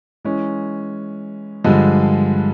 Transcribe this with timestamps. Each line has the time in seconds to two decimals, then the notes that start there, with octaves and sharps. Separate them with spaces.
0.24 E3 G#3 C#4
1.64 G2 D3 F3 G#3